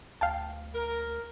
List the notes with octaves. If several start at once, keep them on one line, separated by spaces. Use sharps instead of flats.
D2 F5 G5 A5
A#4